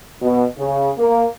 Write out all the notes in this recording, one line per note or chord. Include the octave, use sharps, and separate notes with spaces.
B2
C#3
A#3